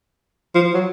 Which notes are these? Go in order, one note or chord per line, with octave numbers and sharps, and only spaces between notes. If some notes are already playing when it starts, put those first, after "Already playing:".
F3
F#3